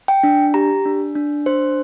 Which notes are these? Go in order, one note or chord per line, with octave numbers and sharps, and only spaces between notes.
G5
D4
G4 A#5
D4
D4
D4 C5